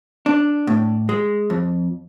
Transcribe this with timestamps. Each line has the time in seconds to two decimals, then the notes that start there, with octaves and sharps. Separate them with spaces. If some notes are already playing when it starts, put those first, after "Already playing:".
0.26 D4
0.67 A2
1.09 G#3
1.50 F2